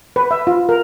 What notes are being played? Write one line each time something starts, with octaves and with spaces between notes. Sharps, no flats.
B4
E5
F4
A#4